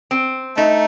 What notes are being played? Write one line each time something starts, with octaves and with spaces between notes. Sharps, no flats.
C4
A3 D#4